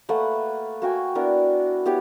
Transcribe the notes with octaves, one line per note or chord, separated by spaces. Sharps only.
A3 A#3 B4 F#5
A#3 F#4 G5 G#5
B3 D4 E4 A#4
B3 E4 G4 C#5